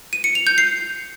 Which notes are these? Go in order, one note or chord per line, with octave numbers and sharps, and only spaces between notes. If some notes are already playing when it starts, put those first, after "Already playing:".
D#7
C#7
F7
G6
C7